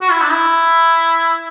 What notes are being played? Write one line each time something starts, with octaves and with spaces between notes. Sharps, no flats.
F#4
E4
D4
E4